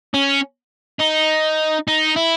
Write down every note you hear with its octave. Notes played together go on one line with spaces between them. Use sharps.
C#4
D#4
D#4
E4